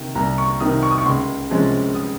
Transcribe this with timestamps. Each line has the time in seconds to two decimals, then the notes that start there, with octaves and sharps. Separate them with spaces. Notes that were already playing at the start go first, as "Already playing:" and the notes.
Already playing: C3 D#3
0.15 C2 A#5
0.38 C#6
0.60 C3 D#3 D#6
0.83 C#6
0.91 D#6
0.98 C#6
1.05 C#2 C6
1.50 C3 F3 G#3 C#4
1.95 D#6